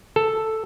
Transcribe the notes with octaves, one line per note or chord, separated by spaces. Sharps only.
A4